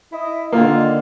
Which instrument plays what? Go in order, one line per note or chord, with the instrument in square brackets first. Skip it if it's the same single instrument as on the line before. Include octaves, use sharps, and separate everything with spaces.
[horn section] E4 D#5
[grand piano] D3 A#3 [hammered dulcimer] D#3 D5 [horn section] F4